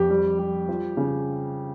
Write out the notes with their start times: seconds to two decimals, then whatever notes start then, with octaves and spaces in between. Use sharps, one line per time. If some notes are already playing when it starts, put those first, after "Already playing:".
Already playing: F2 G4
0.10 G3
0.39 G3
0.69 F3
0.97 C#3